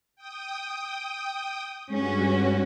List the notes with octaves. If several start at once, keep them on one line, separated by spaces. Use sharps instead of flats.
G5 D#6
G2 G#3 C#4 F#4